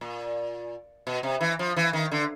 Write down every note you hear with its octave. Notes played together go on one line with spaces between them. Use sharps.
A#2
B2
C3
E3
F3
E3
D#3
D3